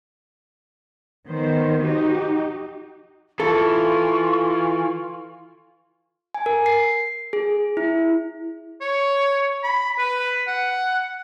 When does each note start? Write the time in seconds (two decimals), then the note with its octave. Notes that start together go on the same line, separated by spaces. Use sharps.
1.29 D#3 B3 C5
1.83 D#4 F#4 G4
3.40 E3 F4 A4 C#6
6.34 G#5
6.46 A#4
6.66 C7
7.33 G#4
7.77 E4
8.81 C#5
9.63 B5
9.99 B4
10.48 F#5